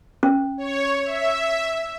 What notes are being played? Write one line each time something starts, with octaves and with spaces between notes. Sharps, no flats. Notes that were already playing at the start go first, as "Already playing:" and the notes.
C#4
C#5
E5